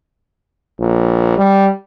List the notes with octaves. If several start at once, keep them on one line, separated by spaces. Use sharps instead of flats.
A#1
G3